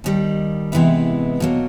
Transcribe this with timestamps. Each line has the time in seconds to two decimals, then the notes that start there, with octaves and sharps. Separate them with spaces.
0.04 D#2 D#3 G3
0.72 C3 E3 G#3 B3 E4
1.40 B2 F#3 A#3